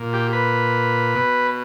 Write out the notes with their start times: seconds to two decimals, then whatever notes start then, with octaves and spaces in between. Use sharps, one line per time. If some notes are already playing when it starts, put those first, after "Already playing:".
Already playing: A#2
0.13 G4
0.33 B4
1.15 B2